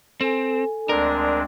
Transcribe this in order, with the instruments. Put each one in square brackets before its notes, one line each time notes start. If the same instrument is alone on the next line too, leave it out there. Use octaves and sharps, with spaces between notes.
[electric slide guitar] C4 [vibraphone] A4 G#5
[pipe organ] D2 G#3 C4 [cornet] D4 [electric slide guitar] A#4 [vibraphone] D5